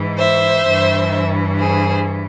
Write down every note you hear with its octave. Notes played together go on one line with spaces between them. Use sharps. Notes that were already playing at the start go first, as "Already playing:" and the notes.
Already playing: G#2 E3
C5 E5
G2 E3
G#4 C5